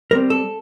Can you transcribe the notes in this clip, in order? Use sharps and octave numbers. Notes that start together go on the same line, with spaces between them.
G3 C4 A#4
A4